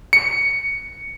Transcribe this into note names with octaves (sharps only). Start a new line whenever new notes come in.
C#7